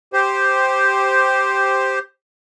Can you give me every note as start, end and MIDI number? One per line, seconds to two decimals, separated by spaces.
0.13 1.99 67
0.13 1.99 72